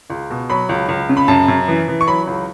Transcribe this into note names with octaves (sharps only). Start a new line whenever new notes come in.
C#2
B2
F#3 B5
C#2
C#2
C#3
B5
F#2 A5
F#2
E3
E3
C#6
F#3 B5
C#2